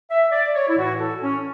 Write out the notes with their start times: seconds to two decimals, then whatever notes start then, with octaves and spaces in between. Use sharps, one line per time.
0.10 E5
0.32 D5
0.55 C#5
0.69 E4
0.77 A2 E3 F#4
0.99 A4
1.22 C#4